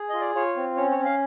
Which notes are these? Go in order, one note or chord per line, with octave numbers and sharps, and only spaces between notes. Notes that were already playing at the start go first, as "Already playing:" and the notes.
Already playing: G#4
F4 D#5
D5
F4 C#5
C4
C#4 C#5
C#5
C#4
F5